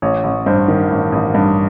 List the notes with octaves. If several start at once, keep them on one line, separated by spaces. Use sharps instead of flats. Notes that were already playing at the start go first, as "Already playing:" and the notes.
A1 C#5
A1
G2 C5
D#3
A1
A1
G2